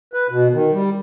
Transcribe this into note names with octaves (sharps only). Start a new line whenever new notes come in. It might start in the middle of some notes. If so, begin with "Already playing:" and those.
B4
B2
D#3
G3